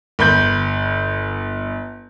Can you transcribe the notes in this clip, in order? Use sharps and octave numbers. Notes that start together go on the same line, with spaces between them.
G1 B5 G6